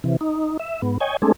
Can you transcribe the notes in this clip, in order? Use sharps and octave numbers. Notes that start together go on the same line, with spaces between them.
C3 E3
D#4
E5
G#2 B3
C#5 D#5 G5 G#5
G#3 A3 C4 D4 G#4 A4